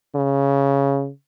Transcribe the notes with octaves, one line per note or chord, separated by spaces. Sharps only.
C#3